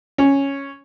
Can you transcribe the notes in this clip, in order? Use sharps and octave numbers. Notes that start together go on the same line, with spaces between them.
C#4